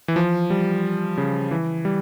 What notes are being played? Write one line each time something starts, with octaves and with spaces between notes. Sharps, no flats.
E3
F3
G3
C#3
E3
G3